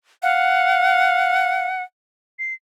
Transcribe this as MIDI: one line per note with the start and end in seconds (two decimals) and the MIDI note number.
0.23 1.67 77
0.23 1.83 78
2.39 2.54 96